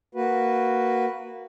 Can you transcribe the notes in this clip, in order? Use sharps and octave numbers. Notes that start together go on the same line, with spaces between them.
A#3 F#4 B4